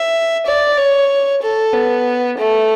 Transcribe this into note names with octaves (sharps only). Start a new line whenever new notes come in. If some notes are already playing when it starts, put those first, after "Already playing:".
Already playing: E5
D5
C#5
A4
B3
A3